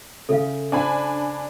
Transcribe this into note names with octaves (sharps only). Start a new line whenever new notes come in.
C#3 A4 E5 F5
D4 C5 G#5 B5